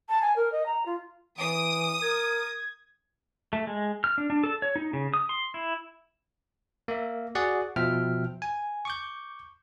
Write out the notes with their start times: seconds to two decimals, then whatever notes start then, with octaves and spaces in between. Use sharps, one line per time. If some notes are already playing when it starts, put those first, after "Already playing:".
0.09 A5
0.22 G#5
0.36 A#4
0.52 D#5
0.66 A#5
0.86 F4
1.38 E3 D#6 D7
2.02 A#4 G#6
3.53 A3
3.67 G#3
4.04 F6
4.18 D4
4.30 D4
4.44 A4
4.62 C#5
4.76 D#4
4.93 C#3
5.14 D#6
5.29 C6
5.54 E4
6.88 A#3 E5
7.35 F#4 G#4 D5 F#5
7.76 B2 F3 E5 G5 F6
8.42 G#5
8.85 C#6 D6 G6